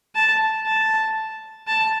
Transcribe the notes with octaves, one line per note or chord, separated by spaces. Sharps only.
A5
A5
A5